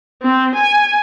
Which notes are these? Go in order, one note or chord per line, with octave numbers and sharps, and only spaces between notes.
C4
G#5